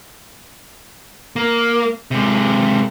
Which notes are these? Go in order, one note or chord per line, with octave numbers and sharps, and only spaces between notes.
A#3
C3 G#3